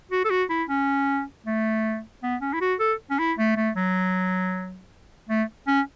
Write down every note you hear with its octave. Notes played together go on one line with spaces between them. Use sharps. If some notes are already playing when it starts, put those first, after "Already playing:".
F#4
A4
F#4
E4
C#4
A3
B3
C#4
E4
F#4
A4
C#4
E4
A3
A3
F#3
A3
C#4